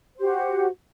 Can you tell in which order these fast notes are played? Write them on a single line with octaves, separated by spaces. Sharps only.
C5 G4 F#4 F#5